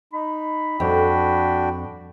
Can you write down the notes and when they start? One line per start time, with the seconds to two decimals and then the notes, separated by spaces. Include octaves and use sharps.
0.13 D#4 B5
0.80 F2 D4 F#4 G5